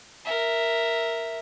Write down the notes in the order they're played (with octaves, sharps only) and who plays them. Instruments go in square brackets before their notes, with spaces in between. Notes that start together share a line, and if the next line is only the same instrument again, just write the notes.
[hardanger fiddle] A#4 E5